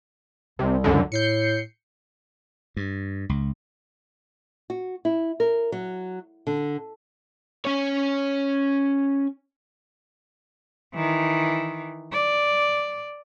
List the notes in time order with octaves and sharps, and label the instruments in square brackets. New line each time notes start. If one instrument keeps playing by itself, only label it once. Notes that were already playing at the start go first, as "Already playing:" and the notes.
[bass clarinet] C2 [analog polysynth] C3
[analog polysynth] C#2 F#2 D3
[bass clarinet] A2 [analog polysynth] G6 C7 C#7
[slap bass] G2
C#2
[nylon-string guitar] F#4
E4
A#4
F#3
D3
[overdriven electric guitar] C#4 C#5
[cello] D#3 E3
D5